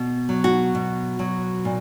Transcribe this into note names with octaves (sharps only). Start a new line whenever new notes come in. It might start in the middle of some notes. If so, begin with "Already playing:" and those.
Already playing: B2
F#3
F#4
B2
F#3
A#2